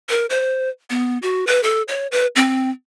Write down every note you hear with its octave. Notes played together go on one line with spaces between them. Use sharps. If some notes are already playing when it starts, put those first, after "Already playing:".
A#4
C5
B3
F#4
B4
A4
C#5
B4
C4